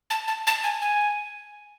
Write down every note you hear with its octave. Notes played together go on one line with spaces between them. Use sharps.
A5
A5
A5
G#5
G#5